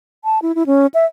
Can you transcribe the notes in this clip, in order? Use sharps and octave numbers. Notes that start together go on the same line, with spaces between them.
A5
E4
E4
C#4
E5